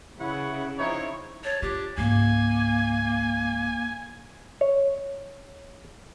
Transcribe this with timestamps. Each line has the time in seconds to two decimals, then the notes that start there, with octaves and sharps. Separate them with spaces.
0.20 C#3 E4 B4 C#5 F#5
0.78 F3 C4 D#4 E4 C#5
1.44 C#5 A5
1.62 D4 F4 G4
1.98 C#2 G#2 A#3 G#5
4.61 C#5